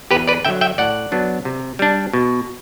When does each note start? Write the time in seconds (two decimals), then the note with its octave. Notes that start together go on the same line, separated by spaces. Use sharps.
0.11 E2 G4 B4
0.27 B4 D5
0.45 D3 F#3 E5 G5
0.61 E5 G5
0.78 A2 D5 F#5
1.12 F#3 B3 D4
1.45 C3
1.79 G3 D4
2.13 B2